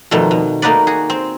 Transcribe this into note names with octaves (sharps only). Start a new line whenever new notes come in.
F2 B2 D#3 G3 A3
B2
A3 A#3 D#4 F#4 B4 D5
F#4 G#4
C4